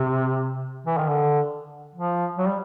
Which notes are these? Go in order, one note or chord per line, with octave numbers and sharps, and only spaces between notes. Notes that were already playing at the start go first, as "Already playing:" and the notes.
Already playing: C3
E3
D#3
D3
F3
F#3
G3